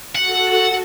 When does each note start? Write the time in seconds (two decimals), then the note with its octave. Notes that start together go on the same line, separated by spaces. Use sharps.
0.15 F#4 A4 F#5